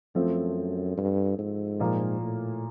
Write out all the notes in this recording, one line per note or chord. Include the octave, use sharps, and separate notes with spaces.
F#2 F3 A3 C4
G2
G#2
A#2 F3 A#3
A2